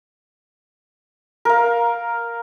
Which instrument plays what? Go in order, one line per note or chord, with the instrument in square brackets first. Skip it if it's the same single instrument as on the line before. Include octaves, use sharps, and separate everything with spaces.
[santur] A#4 F5